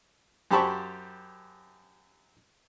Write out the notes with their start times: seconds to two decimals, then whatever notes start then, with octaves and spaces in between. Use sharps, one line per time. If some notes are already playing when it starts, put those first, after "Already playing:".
0.51 F#2 G4 C5 A5 B5 C#6